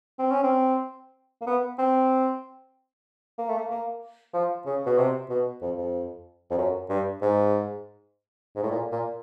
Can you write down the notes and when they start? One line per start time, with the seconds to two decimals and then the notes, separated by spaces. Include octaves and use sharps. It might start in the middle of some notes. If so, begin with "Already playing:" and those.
0.19 C4
0.31 C#4
0.43 C4
1.41 A#3
1.47 B3
1.79 C4
3.38 A#3
3.49 A3
3.58 A#3
3.70 A#3
4.34 F3
4.66 C#3
4.86 B2
4.98 C3
5.30 B2
5.62 F2
5.77 F2
6.51 F2
6.58 F#2
6.89 G2
7.22 G#2
8.56 G#2
8.63 A2
8.71 A#2
8.92 A#2